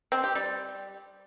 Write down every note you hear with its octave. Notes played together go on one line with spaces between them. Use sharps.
C4
G4
G3